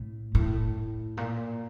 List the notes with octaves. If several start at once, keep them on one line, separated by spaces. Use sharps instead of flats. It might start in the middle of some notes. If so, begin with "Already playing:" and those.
Already playing: A2
A2
A#2